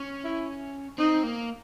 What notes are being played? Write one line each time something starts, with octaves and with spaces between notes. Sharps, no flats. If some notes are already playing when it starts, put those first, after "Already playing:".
Already playing: C#4
E4
C4 D#4
A#3